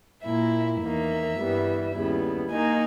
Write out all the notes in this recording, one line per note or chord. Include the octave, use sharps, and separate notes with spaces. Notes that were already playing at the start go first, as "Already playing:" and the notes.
A#2 A#3 E4 E5
E2 D#3 A#3 E5
G2 E3 G3 B3
D#2 C#3 G3 B3 E4
D#3 A#3 D#4 G#5